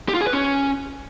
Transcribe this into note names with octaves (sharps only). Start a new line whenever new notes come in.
G4
F4
G#4
B4
C#4